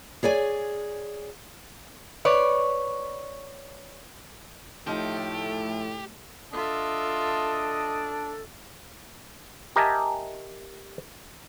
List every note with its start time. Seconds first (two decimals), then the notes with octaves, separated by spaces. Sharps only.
0.23 G#4 C#5 D5 G#5
2.25 B4 C#5 D5
4.87 A2 F3 A3 D#4 G4
6.53 D4 F4 A4 D#5 E5
9.76 G4 A#4 D#5 E5 G#5 A5